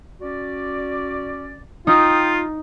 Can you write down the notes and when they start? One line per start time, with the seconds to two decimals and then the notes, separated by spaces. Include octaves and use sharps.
0.21 C#4 F#4 D5
1.87 D#4 F4 G5 D#6